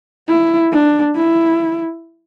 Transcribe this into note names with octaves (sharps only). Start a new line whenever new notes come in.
E4
D4
E4